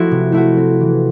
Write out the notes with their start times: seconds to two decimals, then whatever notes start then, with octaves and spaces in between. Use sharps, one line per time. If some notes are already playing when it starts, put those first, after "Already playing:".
Already playing: F3 A3 C4 E4 F#4
0.11 C3
0.32 A3 E4 F#4
0.57 C4
0.81 E3